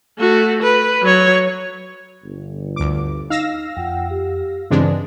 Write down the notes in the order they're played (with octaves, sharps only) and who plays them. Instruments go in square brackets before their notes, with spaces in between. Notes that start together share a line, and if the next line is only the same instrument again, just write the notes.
[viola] A3 F#4
B4
F#3 C#5
[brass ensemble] G1
[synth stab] D2 D6
[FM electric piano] D#4 [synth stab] F5 E6 A#6
[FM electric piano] F2 [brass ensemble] F4 F#5 G5
[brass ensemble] G4
[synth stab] G2 G#3 D4 [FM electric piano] C#3 E3 C4 [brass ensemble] G#4